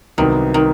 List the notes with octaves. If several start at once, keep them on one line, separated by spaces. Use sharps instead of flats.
C2 C3 D#3 F#3 B3
D#3